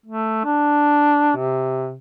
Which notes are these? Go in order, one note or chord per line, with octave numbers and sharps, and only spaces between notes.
A3
D4
C3